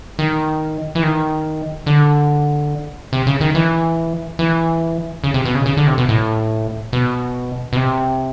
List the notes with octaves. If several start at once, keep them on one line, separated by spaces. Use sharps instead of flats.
D#3
E3
D#3
D3
C3
C#3
D#3
E3
E3
C#3
C3
B2
C#3
C#3
D3
C3
B2
A2
B2
B2
C3